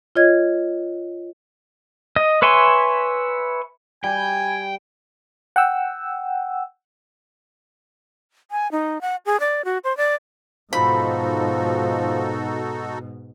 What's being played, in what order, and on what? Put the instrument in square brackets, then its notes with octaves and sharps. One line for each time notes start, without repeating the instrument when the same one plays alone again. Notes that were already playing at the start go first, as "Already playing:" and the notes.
[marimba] F4 C#5 D#5 G#6
[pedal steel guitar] D#5
B4 C#5 E5 G#5 C6
[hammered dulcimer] G3 [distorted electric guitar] G5 [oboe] G#5
[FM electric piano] F#5 G5 E6
[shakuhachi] G#5
D#4
F#5
G#4
D5
F#4
C5
D5
[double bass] G#2 B2 [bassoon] F3 [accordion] D#4 F#4 A4 [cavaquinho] B5